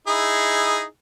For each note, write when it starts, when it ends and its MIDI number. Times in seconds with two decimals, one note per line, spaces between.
0.07 0.84 63
0.07 0.84 64
0.07 0.84 68